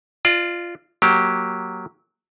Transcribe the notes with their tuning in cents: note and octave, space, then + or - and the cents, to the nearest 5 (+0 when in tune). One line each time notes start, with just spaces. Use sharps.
F4 -10 D5 +35
F#3 +0 A#3 +0 G4 +0